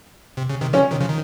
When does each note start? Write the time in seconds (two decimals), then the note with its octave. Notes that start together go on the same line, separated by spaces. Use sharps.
0.37 C3
0.50 C#3
0.61 C3 D#3
0.73 C#3 F3 C#4
0.91 C3 D#3
1.01 C#3 F3
1.09 D#3